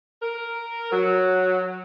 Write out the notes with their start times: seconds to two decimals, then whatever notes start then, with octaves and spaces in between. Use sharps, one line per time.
0.21 A#4
0.91 F#3